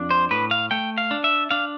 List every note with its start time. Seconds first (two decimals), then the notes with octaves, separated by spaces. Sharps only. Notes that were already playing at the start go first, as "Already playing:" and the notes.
Already playing: F2 D4
0.10 C5
0.31 A2 B4
0.51 F5
0.71 A3 G5
0.98 F5
1.11 D4
1.24 E5
1.51 D4 F5